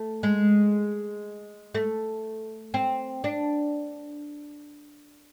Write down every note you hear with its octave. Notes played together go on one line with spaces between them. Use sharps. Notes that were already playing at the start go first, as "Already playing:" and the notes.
Already playing: A3
G#3
A3
C4
D4